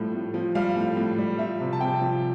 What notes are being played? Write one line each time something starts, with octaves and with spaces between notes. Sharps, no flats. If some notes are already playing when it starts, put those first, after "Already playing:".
Already playing: A2 F3 G3
A2
F3
G3 F5
A2
A2
G3
F3 E5
C3
A5
C3 G5
F3